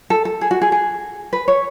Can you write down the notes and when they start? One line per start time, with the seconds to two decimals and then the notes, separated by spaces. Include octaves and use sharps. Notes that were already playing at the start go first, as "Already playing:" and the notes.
0.10 A4
0.25 A4
0.41 G#4
0.51 F#4
0.62 G#4
0.72 G#4
1.33 B4
1.48 C#5